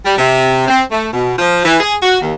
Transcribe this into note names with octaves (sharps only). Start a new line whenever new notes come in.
G3
C3
C4
A3
B2
F3
E3
G#4
F#4
D#2